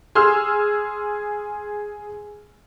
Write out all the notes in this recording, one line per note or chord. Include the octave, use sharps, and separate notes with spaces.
G#4 C6 E6 F6